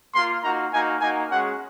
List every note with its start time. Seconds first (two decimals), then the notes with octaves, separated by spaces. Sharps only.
0.14 A#3 F4 C6
0.43 A#3 D#4 F#4 A#5
0.72 A#3 D#4 F#4 G#5
1.00 A#3 D#4 F#4 G#5
1.29 G#3 C#4 F#4 F#5